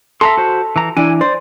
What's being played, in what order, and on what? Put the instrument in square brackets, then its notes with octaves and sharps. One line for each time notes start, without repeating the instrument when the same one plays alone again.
[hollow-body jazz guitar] A4 [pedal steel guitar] E5 A#5 C6
[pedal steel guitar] F#4 C5
E3 A#5
[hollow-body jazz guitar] E3 D4 [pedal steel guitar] G#5
[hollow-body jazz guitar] C5 [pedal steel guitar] D5